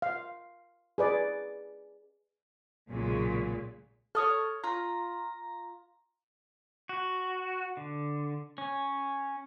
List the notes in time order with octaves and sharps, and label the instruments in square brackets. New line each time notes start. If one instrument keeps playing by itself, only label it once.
[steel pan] F5
G#4 B4 D5
[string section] B1 A#2 C#3 F#3 G#3
[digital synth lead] A4 [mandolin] C#5 D#6 F6
[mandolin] F4 [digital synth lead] A#5
[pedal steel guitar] F#4
D3
C#4